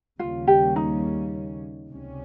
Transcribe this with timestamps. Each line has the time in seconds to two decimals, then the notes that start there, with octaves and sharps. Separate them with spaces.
0.19 D#2 C#3 G3 A#3 C#4 F4
0.47 G4
0.76 D#4
1.90 C#2 C3 G3 C#4